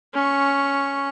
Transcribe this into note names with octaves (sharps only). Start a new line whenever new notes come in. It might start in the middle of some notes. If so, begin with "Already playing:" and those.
C#4 C#6